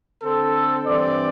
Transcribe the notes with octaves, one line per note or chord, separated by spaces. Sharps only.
D3 C4 A4
G2 E3 C4 D5